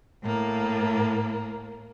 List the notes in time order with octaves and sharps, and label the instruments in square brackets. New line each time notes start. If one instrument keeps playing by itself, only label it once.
[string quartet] A2 A#3